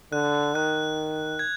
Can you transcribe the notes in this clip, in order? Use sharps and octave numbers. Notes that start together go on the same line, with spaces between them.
D3 F#6
D#3 F#6
G#6